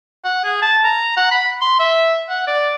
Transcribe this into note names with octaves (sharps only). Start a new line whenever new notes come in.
F#5
G#4
A5
A#5
F#5
B5
C6
E5
F#5
D5